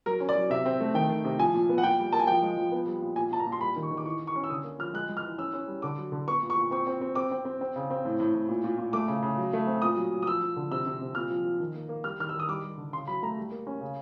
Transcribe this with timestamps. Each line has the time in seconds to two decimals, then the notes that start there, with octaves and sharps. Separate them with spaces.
0.06 F#3 A#4
0.20 C#4
0.29 D5
0.36 F#3
0.50 C3 E5
0.65 C4
0.80 A3
0.94 D#3 G5
1.09 D#3
1.25 C3
1.39 F3 G#5
1.55 A#2
1.69 B3
1.78 F#5
1.83 A#2 G5
1.99 G3
2.12 A#3 A5
2.19 G#5
2.27 F3 G5
2.43 G#3
2.57 F3
2.72 B3
2.86 G3
3.02 A#2
3.16 A#2 G#5
3.32 A#2 A5
3.39 A#5
3.47 A#2
3.52 C6
3.60 G3 B5
3.76 D#3
3.83 C#6
3.91 D#3
3.97 D6
4.05 E3 C#6
4.20 E3
4.27 C#6
4.36 C#4
4.44 E6
4.50 D3 D#6
4.64 A#3
4.79 F3 F6
4.94 G#3 F#6
5.09 G#3
5.17 F6
5.23 E3
5.38 C#4 E6
5.53 C#4
5.67 G3
5.82 D3 D6
5.98 F#3
6.12 D3
6.27 B3 C#6
6.43 A#2
6.50 C#6
6.57 A#2
6.71 C4 C#6
6.87 C4
7.01 C4
7.15 C4 D6
7.31 C4
7.45 C4
7.61 C4
7.76 C#3
7.90 C4
8.05 A2
8.20 A2
8.34 A2
8.49 A#2
8.64 A#2
8.78 A#2
8.93 A3 D6
9.08 C#3
9.22 C#3
9.38 F#3
9.53 A3
9.67 C4
9.82 A#2 D#6
9.96 F#3
10.12 F#3
10.22 D#6
10.27 F3 E6
10.42 F3
10.56 D3
10.71 C3 E6
10.86 C3
11.01 C3
11.15 A#2 F6
11.30 F3
11.45 F3
11.60 D#3
11.75 A#3
11.89 A#3
12.04 G3 F6
12.20 D#3 F6
12.29 E6
12.34 D#3
12.40 D#6
12.49 G3 D6
12.64 G3
12.77 D3
12.93 C#3 C6
13.07 F#3 B5
13.23 A3 A#5
13.37 G3
13.52 A#3
13.67 C#4
13.81 C#3